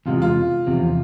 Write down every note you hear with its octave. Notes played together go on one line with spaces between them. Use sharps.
E2 C3 G#3 F4
F4
E2 C3 F3